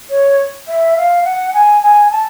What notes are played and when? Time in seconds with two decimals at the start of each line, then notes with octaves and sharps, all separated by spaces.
0.10 C#5
0.68 E5
0.97 F5
1.24 F#5
1.53 G#5
1.83 G#5
2.11 A5